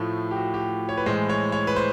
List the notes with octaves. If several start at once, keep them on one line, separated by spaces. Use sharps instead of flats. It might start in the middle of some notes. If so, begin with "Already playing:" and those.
Already playing: A2 F3 A3
G4
F#4
G4
C#5
B4
A2 E3 G#3 C5
C#5
C#5
B4
C5